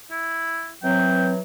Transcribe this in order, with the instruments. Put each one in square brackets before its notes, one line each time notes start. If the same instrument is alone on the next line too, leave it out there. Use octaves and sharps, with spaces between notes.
[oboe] E4
[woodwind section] E3 F#3 [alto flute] C4 [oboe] G5